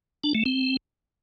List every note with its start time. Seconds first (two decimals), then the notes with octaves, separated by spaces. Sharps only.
0.24 D4
0.35 A3
0.46 C4